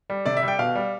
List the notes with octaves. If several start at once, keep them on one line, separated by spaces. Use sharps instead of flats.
G3
C3 D5
E5
G3
G5
B2 F5
G3